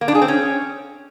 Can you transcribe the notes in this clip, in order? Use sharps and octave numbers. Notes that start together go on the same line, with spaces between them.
A#3
D4
G#4
C4
C#4